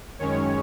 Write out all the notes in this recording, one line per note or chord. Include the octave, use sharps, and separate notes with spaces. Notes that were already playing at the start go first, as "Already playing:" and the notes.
F#2 D#3 G#3 C#4 C#5